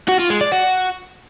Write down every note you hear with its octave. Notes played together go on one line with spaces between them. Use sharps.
F#4
F4
G#3
D5
F#4